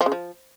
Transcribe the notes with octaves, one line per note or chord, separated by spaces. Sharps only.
F3
C#3
F3